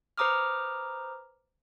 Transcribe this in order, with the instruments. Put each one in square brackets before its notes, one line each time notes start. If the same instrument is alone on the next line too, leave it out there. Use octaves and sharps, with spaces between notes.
[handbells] B4 C5 A#5 D6 D#6 F6